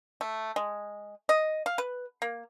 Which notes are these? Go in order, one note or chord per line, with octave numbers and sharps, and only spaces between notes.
A3
G#3
D#5
F5
B4
A#3